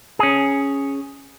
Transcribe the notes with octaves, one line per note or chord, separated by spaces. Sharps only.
C#4 G#4